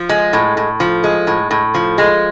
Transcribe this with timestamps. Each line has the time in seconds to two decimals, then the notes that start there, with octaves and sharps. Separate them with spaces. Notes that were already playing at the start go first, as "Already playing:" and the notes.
Already playing: F3
0.09 G#3
0.33 A2
0.57 A2
0.80 F3
1.04 G#3
1.27 A2
1.51 A2
1.75 F3
1.98 G#3